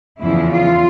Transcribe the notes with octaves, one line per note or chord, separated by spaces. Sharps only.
E2 C#3 F3 E4
F4